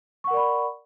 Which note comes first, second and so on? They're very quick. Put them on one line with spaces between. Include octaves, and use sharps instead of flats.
C#6 F#5 A#4 D5 B5